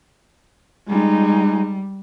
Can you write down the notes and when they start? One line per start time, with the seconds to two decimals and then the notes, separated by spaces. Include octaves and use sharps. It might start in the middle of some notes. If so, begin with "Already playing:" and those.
0.89 G3 G#3 D#4